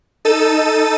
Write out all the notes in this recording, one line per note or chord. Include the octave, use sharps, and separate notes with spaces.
D#4 A4 A5 E6 A6 D#7